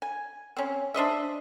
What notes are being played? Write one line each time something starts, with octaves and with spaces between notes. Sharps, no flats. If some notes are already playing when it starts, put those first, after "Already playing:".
G#5
C4 C#4
D4 C5 D#5 E5